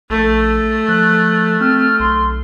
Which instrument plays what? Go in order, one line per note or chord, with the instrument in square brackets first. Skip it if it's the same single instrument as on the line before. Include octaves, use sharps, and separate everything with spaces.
[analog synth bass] A#1 [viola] A3
[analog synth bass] F3 [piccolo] F#6
[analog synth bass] C4 [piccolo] F6
[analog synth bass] B1 [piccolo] C6